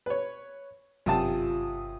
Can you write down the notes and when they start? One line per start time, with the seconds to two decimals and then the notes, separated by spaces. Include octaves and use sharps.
0.06 B4 C#5
1.06 G1 F#2 C3 F4 A5 D#6